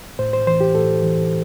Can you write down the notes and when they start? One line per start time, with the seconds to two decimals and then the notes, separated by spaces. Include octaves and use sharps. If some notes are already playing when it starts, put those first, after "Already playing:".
0.19 A2 C5
0.33 C5
0.47 E3 C5
0.61 G4
0.75 A2 A4
1.03 E3